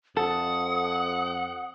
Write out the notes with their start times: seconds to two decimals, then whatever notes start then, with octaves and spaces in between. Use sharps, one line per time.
0.17 F2 A4 F#5 D#6